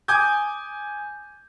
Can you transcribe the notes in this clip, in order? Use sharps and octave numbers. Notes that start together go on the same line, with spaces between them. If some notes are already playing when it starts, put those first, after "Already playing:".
G#5 D6 D#6 G6 G#6